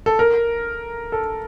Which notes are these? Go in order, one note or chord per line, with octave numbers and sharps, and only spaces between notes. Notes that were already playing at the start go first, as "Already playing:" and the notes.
A4
A#4
A4